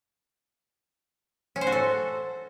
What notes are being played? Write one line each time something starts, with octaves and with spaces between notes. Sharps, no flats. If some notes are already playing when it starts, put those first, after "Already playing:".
C#4
C5
F#4
A4